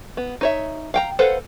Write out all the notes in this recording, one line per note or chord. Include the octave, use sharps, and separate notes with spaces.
B3
D#4 C#5 E5
F5 G5 A#5
A4 B4 C5 F5 F#5